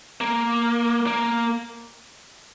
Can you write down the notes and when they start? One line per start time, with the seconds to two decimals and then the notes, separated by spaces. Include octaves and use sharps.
0.21 A#3
1.07 A#3